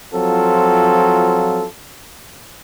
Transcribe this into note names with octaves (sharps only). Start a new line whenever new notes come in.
F3 F#3 C4 F4 A4